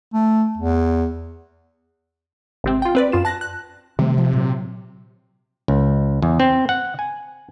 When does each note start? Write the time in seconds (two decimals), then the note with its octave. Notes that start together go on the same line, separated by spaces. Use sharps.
0.13 A3
0.58 E2
2.64 G#1 C3 C4
2.82 F4 G5
2.95 C4 B4 D5
3.12 F#2 F4 E7
3.25 A5 F#6 A#6
3.41 F#6
3.99 C3 D#3 G3 A3
4.18 F3
4.33 A#2 F#3
5.68 C#2
6.22 E2
6.40 C4
6.69 F#5
6.99 G#5